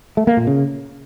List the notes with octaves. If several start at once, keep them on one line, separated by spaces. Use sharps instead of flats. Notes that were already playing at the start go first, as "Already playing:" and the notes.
A3
A#3
A#2
C#3